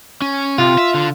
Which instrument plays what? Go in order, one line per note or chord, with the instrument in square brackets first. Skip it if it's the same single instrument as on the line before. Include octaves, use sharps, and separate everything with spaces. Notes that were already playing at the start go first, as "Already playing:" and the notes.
[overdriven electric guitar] C#4
[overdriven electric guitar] C3 [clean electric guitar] F4
[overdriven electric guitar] E5
D3